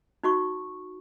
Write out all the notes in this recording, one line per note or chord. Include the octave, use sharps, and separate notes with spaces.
D#4 F#4 C#6